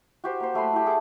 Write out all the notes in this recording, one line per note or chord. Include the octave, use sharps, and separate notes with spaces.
F#4 G4 C5
A#3 C5
F#3 A3 B5 C6
E4 G4
G#4 A4 F#5 D6